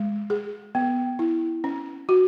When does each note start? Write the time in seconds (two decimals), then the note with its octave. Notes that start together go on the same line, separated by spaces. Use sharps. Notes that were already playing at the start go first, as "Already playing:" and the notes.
Already playing: G#3
0.30 G#4
0.75 B3
1.19 E4
1.64 C#4
2.09 F#4